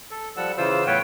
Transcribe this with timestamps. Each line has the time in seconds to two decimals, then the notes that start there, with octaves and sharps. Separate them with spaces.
0.11 A4
0.37 F3 G3 A4 F#5 E6
0.57 C#3 E3 F4 C5 E6
0.87 A2 B3 B4 C#5 G5